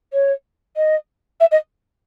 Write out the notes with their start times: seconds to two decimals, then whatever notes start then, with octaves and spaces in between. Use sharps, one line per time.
0.13 C#5
0.76 D#5
1.40 E5
1.51 D#5